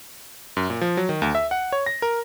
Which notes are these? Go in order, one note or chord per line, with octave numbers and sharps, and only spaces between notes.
F#2
A#2
F3
F#3
D#3
D2
E5
F#5
C#5
A#6
A#4